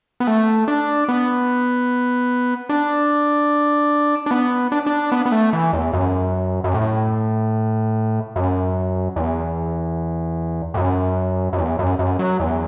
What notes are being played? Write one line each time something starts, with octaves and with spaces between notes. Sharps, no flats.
B3
A3
D4
B3
D4
D4
B3
D4
D4
B3
B3
A3
E3
E2
F#2
F#2
A2
F#2
E2
A2
F#2
F#2
E2
F#2
F#2
F#3
E2